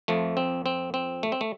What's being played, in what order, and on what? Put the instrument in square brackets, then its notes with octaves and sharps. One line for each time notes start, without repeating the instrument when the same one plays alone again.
[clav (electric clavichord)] F2 F3 A3
C4
C4
C4
A3
C4
A3